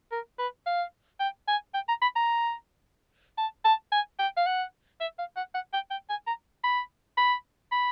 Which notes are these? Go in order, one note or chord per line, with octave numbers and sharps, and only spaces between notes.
A#4
B4
F5
G5
G#5
G5
A#5
B5
A#5
A5
A5
G#5
G5
F5
F#5
E5
F5
F#5
F#5
G5
G5
G#5
A#5
B5
B5
B5